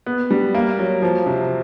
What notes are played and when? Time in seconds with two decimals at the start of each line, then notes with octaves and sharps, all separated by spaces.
0.06 B3
0.31 G3
0.55 A#3
0.79 F#3
1.02 F3
1.26 C3